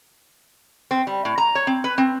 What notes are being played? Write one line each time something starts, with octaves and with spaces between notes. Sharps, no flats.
C4
G3
A2
A#5
C#5
C4
B4
C4